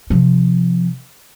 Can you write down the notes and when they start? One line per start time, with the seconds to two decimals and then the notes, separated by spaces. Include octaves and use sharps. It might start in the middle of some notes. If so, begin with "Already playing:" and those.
0.10 C3 F3